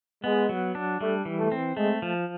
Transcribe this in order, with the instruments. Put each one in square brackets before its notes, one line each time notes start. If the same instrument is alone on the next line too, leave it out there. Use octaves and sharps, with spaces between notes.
[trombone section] G#3 [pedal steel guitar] B3
[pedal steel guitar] F#3
D4
[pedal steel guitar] G3 [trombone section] A3
[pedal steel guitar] E3
[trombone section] A3
[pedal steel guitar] C4
[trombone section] G#3 [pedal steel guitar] A3
[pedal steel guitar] F3